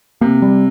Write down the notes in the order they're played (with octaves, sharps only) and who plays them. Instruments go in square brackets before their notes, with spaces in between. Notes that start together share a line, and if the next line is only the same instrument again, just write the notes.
[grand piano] C3 [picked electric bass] A#3
[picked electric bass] G3